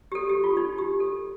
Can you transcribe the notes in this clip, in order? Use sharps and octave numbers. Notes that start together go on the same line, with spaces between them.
G4
A4
G4
F4
D#4
G4
A4